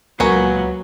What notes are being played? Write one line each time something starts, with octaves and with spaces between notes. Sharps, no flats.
C#2 A#2 F#3 A#3 B3 C#4 C#5